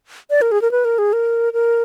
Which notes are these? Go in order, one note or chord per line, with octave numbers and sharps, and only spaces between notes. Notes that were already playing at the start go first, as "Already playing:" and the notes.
D5
A#4
G#4
A#4
B4
A#4
G#4
A#4
A#4